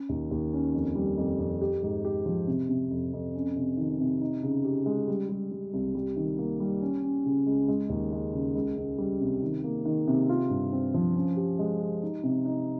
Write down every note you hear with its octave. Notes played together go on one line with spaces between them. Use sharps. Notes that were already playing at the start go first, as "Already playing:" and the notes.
Already playing: C#4
D#2
D#2
C#4
F2
G3
F2
F2
G4
G#2
G4
F3
C3
C3
F2
F2
C#4
C3
D#3
C3
D#4
C#3
G4
G#3
G3
G3
G3
C2
G3
D#3
A#3
G3
C#4
C#4
C#3
C#2
G#3
D#2
G#3
C#3
C#2
C#2
G3
C3
D#3
A#3
D#3
C3
F4
G2
C4
F3
C#4
G4
G#3
G4
D#4
C3
D#4